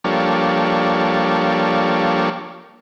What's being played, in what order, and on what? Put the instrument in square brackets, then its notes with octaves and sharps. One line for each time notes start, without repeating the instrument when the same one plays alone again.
[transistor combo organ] F3 G3 A#3 D4 A4 C#5